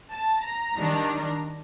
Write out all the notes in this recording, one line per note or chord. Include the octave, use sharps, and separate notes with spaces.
A5
A#5
D#3 G3 D4